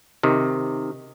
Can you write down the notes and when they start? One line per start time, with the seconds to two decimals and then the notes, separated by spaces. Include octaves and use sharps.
0.23 C3 D#3